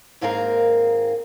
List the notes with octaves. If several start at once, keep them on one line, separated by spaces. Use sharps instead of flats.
D#2 G#2 A#3 C4 G#4 A#4